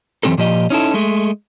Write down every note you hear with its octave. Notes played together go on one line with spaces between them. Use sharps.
F#2 E3 F3 C4 G4 A4
A#2 F3 G4 D#5
C#4 D#4 E4 A4
G#3 A3